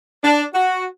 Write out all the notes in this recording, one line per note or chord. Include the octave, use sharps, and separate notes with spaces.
D4
F#4